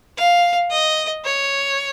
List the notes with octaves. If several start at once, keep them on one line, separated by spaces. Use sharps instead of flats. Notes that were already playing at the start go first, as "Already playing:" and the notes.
F5
D#5
C#5